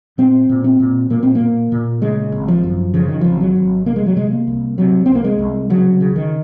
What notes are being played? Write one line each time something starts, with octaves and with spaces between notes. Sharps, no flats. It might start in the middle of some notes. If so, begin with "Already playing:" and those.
A#2 C4
A#2
C4
A#2
A#2 A#3
C4
A#3
A#2
A#2
C#3 G#3
G#1
F3
F#2
C#3 F3
D#3
G#1 F3
F#3
G#1
C3 A#3
G#3
F#3
C3 G#3
A#3
C2
C3 F#3
C2 C4
A#3
G#3
C2
C#3 F#3
C#3
D#3